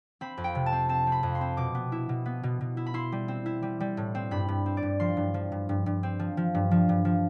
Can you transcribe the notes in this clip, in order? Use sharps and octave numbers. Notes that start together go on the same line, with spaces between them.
C4 B5
F2
G5
C3
A5
C4
C4 A5
C4
B5
F2
C6
C4
B2 D6
B3
E4
B2
B3
B2
B2
E4
B5
E4 C6
G3
C4
E4
G3
G3
A2
C4
G2 B5
G2
C4
D5
G2
F3 C6
G2
F3
G2
G2
G2
C4
F3
F3
G2
F3
G2
F3